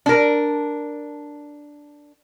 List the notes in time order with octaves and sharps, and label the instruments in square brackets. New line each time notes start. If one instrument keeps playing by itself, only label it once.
[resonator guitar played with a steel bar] D4 A#4